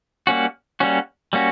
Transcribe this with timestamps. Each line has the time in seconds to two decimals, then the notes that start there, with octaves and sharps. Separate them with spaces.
0.27 G3 A#3 C#4 F#4
0.80 G3 A#3 C#4 F#4
1.33 G3 A#3 C#4 F#4